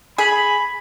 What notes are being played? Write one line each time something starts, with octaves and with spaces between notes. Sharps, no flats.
G#4 B5